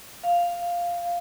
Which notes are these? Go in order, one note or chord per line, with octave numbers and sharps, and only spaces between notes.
F5